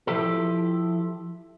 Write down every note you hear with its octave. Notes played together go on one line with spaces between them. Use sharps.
F3 E4 G4 A4